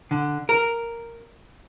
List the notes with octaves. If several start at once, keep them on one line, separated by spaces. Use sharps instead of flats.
D3
A#4